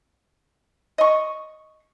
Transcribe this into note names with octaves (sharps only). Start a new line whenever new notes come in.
D#5 C#6